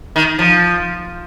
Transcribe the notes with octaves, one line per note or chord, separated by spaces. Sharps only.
D#3
F3